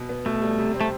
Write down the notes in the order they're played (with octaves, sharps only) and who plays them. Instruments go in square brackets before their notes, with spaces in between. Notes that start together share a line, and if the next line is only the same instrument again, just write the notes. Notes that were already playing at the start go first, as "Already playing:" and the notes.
Already playing: [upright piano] B2
B3
[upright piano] B2 [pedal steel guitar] A3
[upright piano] G3
C3
C4
[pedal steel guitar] A3